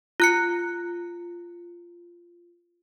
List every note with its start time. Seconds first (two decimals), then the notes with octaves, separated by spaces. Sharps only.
0.20 F4 F#6 C#7